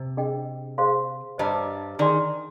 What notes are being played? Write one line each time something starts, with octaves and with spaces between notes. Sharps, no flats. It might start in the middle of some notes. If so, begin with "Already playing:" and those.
Already playing: C3
D4 G#4 D#5 G5
G#4 C5 F5 C6
G2 G3 C5 D#5 A#5
D#3 G#4 D5 G#5 C6